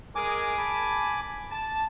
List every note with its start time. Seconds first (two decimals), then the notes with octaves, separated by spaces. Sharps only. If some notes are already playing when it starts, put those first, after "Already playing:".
0.15 G#3 G#4 A#4 G#5 D6
0.58 A5 B5
1.51 A5